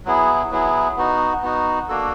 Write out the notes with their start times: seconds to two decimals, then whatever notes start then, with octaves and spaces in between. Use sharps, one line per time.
0.05 F#3 B3 E4 G#4
0.51 F#3 B3 E4 G#4
0.97 B3 D#4 F#4
1.43 B3 D#4 F#4
1.89 A#3 D4 F#4 A4